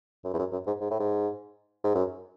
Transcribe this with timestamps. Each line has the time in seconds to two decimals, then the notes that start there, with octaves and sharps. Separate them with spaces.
0.24 F#2
0.34 E2
0.39 F#2
0.52 F#2
0.67 G#2
0.81 G#2
0.91 A2
1.00 G#2
1.84 G#2
1.95 F#2